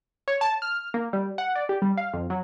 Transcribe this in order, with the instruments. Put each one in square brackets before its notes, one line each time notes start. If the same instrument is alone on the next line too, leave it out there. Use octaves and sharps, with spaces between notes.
[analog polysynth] C#5
A5
F6
A#3
G3
F#5
D5
G4
G3
F5
F2
F#3